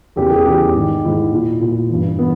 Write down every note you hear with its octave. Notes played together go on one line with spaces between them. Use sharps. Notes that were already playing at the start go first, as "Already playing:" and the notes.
E2 C#3 E3 G4
G#4
E2 C#3 E3 G4
G4
G#2 D#3
G#2 D#3 E4
A#2
A#2
G2 E3
E3 B3